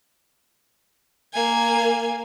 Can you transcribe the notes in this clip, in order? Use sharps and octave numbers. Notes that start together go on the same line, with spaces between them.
A#3 G#5